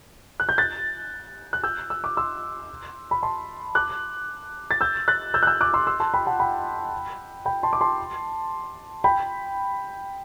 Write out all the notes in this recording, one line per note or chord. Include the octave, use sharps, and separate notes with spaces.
F#6
G6
F#6 A6
F#6
E6 G6
E6
D6
C6 E6
B5
A5 C6
D6 F#6
A6
E6 G6
F#6 A6
E6 G6
F#6
E6 G6
D6 F#6
C6 E6
C6 E6
A5 C6
G5 B5
F#5 A5
G5 B5
G5 B5
A5 C6
D6
A5 C6
G5 B5